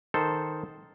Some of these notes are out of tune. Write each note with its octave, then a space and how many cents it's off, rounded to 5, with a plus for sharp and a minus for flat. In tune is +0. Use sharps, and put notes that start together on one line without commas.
D#3 +0 A4 +0 C5 +0